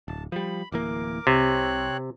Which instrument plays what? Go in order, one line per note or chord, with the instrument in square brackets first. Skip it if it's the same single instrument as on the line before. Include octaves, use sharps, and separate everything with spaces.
[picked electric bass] D1 [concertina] A5
[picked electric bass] F3 G3 [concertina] B5
[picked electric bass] D1 E3 A#3 [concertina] A#4 D6
[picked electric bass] C2 [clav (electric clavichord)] C3 [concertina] C4 C#5 F#6